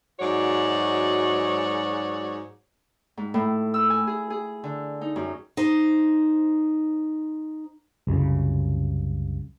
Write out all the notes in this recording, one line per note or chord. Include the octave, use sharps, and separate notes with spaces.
G#2 F#3 G#3 F#4 C#5 D5
G#2
A2
E6
G#5
G#4
G#4
D3
D#4
F#2
D#4 C5
C2 F#2 C#3